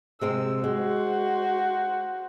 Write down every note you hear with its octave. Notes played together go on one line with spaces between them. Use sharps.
C3 G#3 C4 E6
G#3 F#4 C5